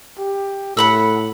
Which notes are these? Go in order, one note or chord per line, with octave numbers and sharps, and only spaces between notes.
G4
A2 A4 F#5 B5 E6